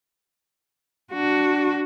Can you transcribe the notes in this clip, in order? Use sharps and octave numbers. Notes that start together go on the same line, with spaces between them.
D4 F#4